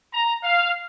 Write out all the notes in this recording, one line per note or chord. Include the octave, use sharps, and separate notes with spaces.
A#5
F5